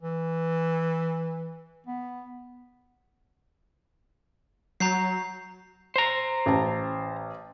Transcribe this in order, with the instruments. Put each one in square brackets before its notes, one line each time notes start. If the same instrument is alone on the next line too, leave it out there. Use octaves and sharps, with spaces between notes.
[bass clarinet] E3
B3
[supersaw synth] F#3 [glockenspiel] A#5 G6 C7
[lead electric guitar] C5 A#5
[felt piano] A1 A5